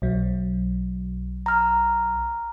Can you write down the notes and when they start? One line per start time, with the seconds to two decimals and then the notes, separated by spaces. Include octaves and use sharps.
0.02 B1 F#3
1.46 A#5 F6